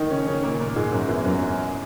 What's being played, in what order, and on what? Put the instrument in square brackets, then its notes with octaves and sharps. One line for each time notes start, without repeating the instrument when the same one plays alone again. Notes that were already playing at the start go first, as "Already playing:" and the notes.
Already playing: [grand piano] D#3 D#4
C#3 C#4
C#3 C#4
A#2 A#3
A#2 A#3
G#2 G#3
F#2 F#3
E2 E3
F#2 F#3